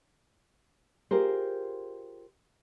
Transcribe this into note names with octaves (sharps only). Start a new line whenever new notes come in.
F4 G4 G#4 A#4 C5